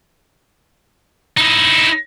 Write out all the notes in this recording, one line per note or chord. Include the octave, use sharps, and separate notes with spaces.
D#4 E4